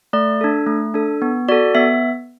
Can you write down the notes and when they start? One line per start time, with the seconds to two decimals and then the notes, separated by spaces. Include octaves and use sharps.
0.13 A3 D5
0.41 D4 A4
0.67 A3
0.94 D4 A4
1.22 B3
1.48 F#4 A4 D5
1.75 B3 E5